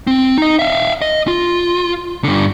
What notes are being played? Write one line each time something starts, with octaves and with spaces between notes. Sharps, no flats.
C4
D#4 D#5
E5 F5
D#5
F4
G2 D3